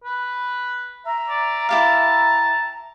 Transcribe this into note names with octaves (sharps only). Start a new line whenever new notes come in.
B4
E5 A#5
D5
E4 G4 F5 A5